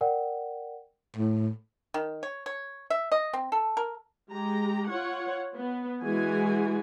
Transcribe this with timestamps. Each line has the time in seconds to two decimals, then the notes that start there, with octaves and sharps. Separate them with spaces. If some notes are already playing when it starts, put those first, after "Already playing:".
0.01 A#4 D5 F#5 G5
1.15 A2
1.94 D#3
2.23 C#5
2.46 C#5
2.90 E5
3.12 D#5
3.33 C4
3.52 A4
3.77 A#4
4.31 G#3 G4 A#5
4.88 F4 C#5 F#5
5.56 B3
6.04 E3 G#3 F#4 G#4 G#5